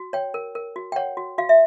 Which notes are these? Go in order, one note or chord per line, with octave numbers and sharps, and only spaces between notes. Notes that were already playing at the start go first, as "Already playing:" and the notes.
Already playing: F#4
C#5 G5
A#4
A#4
F#4
G5
C#5 F#5
F#4
F#4 F5
E5